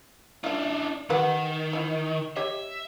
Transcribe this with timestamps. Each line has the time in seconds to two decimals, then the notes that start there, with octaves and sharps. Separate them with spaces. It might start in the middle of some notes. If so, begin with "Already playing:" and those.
0.44 D4 D#4 F4 E5
1.10 D#3 G4 B4 F#5
1.73 F3 E4
2.36 G4 C#5 D#5 E5